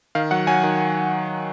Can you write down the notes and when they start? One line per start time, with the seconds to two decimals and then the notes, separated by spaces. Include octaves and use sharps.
0.15 D#3 F5
0.31 F#3 F#5
0.47 F#3 G#5
0.63 D#3